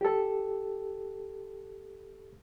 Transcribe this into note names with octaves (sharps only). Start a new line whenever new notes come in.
G4 A4